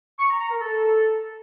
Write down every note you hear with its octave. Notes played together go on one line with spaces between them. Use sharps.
C#6
A#5
A#5
A#4
A4